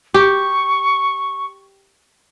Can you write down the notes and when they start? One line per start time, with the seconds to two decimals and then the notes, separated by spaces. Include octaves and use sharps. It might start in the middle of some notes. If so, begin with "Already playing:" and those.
0.14 G4 C#6